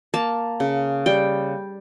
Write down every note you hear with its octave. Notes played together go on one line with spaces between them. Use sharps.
A#3 A5
C#3
G3 G5